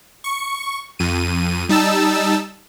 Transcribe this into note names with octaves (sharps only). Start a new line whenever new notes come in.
C#6
F2 D#7
G3 D#4 A5 E6